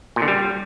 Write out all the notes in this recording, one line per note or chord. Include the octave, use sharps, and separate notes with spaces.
A#2
D3
G3